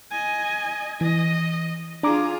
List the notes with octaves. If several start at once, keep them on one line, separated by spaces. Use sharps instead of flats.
D#5 G#5
E3 D#5
D4 F4 G#4 A#5 D6